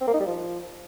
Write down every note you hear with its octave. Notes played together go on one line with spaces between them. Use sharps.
C4
A#3
D#4
G3
F3